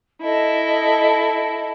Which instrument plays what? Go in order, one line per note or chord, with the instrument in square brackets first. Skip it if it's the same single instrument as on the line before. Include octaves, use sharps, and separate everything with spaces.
[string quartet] E4 A4 [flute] D#5